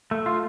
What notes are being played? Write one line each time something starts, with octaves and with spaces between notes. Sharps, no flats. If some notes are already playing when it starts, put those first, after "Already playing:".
A3
F4